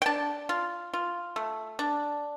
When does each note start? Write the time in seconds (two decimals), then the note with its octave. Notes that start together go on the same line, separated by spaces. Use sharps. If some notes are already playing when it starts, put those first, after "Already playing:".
0.02 G5
0.06 D4 A5
0.49 F4
0.94 F4
1.36 A3
1.79 D4